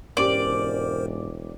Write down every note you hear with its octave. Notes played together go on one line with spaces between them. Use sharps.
E1 G#2 C#4 G4 A#4 C5 D5